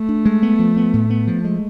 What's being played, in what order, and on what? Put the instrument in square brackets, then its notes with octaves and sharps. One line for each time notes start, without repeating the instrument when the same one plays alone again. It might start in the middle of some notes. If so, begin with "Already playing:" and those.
Already playing: [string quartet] A3
[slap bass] D4
G#3
B3
F3
B3
A2
B3
F3
G#3